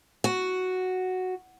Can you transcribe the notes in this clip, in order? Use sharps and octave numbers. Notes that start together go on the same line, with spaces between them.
F#4